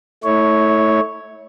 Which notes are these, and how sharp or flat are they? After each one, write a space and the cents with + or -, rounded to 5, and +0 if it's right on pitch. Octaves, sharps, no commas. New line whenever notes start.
A3 +0 E4 -30 C#5 +0